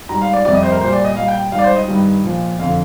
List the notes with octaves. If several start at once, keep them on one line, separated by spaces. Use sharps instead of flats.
G#2 G3 A#5
F5
D5
F2 C3 G3 D5
D#5
C5
A#4
A#2 G3 C5
D5
D#5
A#2 G3 F5
G5
G#2 G3 F5
D5
C5
D#5
G2 D#3 G3
A#2 F3
F2 D3 F3 F5